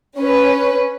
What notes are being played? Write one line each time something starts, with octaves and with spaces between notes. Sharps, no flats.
C#4 B4